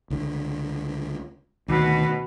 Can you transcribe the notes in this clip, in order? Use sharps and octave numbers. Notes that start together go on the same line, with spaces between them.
C#2 D3
D2 B2 D#3